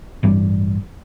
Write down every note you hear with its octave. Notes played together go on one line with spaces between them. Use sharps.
A1 G2 E3 G3